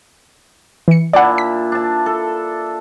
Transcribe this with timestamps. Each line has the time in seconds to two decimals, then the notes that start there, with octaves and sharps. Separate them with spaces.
0.88 E3 C#7
1.13 A#2 D4 E4 D5 F#5
1.38 B6
1.72 D4 A5
2.06 A4